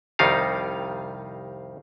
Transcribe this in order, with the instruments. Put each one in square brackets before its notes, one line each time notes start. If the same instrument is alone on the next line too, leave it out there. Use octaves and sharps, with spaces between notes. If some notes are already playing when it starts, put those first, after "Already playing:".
[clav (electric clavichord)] C2 F2 D#3 G3 D#4 F5